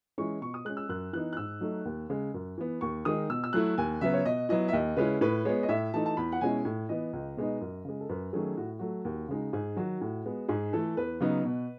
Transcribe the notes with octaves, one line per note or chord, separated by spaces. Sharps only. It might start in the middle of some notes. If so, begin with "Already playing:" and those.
E3 G#3 C#4 E4 C#6
B2 C#6
D#6
G#3 C#4 F#6
E6
F#2 F#6
E3 B3 D#4 F#6
F#6
G#2 E6
F#3 A3 D#4
D#2
C#3 G#3
F#2
E3 B3
D#2 C#6
D#3 G#3 D#4 D#6
B2 E6
E6
F#3 A3 E4 F#6
D#2 G#5
C#3 F#3 B3 E5
C#5
B2 D#5
F#3 B3 E4 D#5
E5
D#2 D#5
C#3 G#3 C#4 E4 B4
A2 B4
G#3 B3 C#5
D#5
A2 E5
E3 A3 D#4 A5
A5
E2 B5
F#5
B2 G#3 C#4 E4 G#5
A2
E3 B3 D#5
C#2
B2 G#3 B3 D#4
F#2
C#3 G#3
A4
F#2 B4
D#3 F#3 A3 C#4 G#4
A2 F#4
F#3 A3 F#4
D#2
C#3 G#3 D#4
G#2 G#4
D#3 F#3 F#4
A2
G#3 B3
G#2 G#4
E3 A3 A4
E2 B4
C#3 F#3 B3 D#4
B2